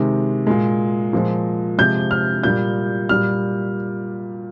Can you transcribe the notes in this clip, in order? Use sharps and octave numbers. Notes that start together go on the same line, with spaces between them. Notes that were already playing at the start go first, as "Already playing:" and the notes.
Already playing: C3 D#3 G#3
A#2 G#3
A#2 F3 G#3
C3 F3 G#3 G6
F6
A#2 G3 G6
A#2 G3 F6